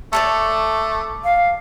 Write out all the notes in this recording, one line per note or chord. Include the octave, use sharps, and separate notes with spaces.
A3 A4 C#5 D5
F5